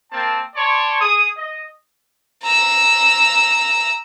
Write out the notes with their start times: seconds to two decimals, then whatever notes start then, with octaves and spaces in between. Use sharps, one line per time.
0.12 A#3 C4 A5
0.55 C#5 D5 A5 C6 C#6
1.01 G#4 D#6
1.36 D#5
2.43 A#5 E6